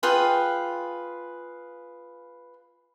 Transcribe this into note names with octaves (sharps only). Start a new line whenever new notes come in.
F4 G#4 B4 G5